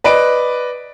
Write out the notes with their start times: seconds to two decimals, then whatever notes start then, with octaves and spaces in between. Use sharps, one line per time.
0.04 B4 D5 D#5 D7